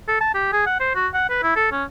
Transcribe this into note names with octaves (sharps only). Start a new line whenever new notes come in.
A4
A5
G4
G#4
F#5
C5
F#4
F#5
B4
E4
A4
C#4